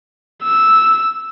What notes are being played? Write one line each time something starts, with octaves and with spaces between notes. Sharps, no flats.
E6